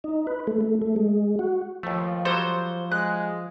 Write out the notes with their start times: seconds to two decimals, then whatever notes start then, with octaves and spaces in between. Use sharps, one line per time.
0.04 D#4
0.27 B4
0.47 A3
0.61 A3
0.82 A3
0.96 G#3
1.39 F#4
1.83 D#2 F3 A3
2.25 F#3 G3 A4 C5
2.92 G#3 F#6